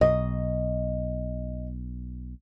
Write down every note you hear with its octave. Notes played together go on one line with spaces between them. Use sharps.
B1 D#5